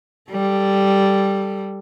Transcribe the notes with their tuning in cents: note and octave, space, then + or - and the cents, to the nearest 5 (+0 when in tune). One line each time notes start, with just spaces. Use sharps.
G3 +0 A4 +0